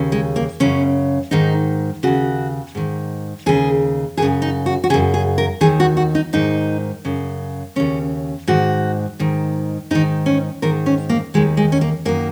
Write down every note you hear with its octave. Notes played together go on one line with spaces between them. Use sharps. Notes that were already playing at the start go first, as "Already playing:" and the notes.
Already playing: D#2 C#3
G#3
A#3
F#2 C#3 C#4
G#2 D#3 D#4
D#2 C#3 F#4
G#2 D#3
D#2 C#3 G#4
F#2 C#3 G#4
D#4
F#4
F#4
F#2 C#3 G#4
G#4
A#4
D#2 D#3 G#4
F#4
F#4
D#4
G#2 D#3 D#4
F#2 C#3
D#2 C#3 C#4
G#2 D#3 F#4
G#2 D#3
G#2 D#3 D#4
C#4
G#2 D#3 A#4
C#4
A#3
D#2 D#3 G#3
G#3
C#4
A#3
F#2 D#3 A#3